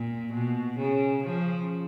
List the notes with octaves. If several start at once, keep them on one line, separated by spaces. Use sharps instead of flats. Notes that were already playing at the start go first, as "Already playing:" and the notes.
Already playing: A#2
B2
C#3
C#3 F3